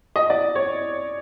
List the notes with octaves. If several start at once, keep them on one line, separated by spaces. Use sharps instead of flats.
D#5
D5
C#5